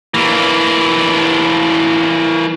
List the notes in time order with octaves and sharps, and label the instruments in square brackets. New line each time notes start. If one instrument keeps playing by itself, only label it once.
[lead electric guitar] E3 A#3